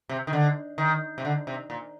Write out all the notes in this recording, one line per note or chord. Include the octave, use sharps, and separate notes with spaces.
C3
D#3
D3
D#3
C3
D3
C3
A#2